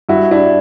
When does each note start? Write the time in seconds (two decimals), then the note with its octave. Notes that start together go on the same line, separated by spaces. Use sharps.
0.09 G2 E4 F#4
0.31 D4 E4